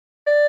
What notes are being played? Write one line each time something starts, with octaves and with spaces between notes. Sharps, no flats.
D5